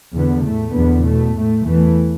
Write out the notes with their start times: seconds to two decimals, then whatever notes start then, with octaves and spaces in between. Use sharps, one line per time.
0.13 E2 D3 B3
0.43 A2 A3
0.74 E2 D3 B3
1.04 B2 A3
1.34 A2 A3
1.64 E2 E3 A3